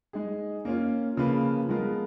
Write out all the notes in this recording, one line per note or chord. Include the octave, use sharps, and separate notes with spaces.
G#3 D#4 G#4
A#3 C#4 F4
C#3 F3 A#3 F4 B4
F3 G#3 B3 F4 A#4